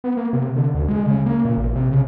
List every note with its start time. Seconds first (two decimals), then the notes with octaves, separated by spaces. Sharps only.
0.04 B3
0.17 A#3
0.33 C3
0.56 D3
0.74 D2
0.89 G#3
1.06 C#3
1.26 A#3
1.45 A#2
1.57 A1
1.75 C3
1.91 C#3